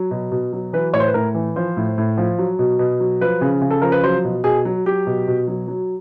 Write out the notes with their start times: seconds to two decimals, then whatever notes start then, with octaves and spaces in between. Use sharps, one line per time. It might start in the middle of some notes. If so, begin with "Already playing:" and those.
Already playing: F#3
0.11 B2
0.32 B2
0.52 F#3
0.73 E3 B4
0.94 A2 C#5
1.00 C5
1.08 B4
1.14 A2 A#4
1.35 E3
1.56 F3 C5
1.77 A2
1.98 A2
2.18 F3
2.38 F#3
2.59 B2
2.79 B2
3.00 F#3
3.21 F3 B4
3.41 C#3
3.62 C#3
3.71 A4
3.82 F3 A#4
3.92 B4
4.03 F#3 C5
4.24 B2
4.44 B2 G#4
4.65 F#3
4.86 F#3 G4
5.07 B2
5.28 B2
5.47 F#3
5.68 F#3